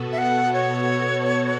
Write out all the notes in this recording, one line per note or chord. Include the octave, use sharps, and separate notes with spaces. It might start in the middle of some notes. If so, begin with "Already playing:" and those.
Already playing: B2 B3 F#4 A4
E5
F#5
C#5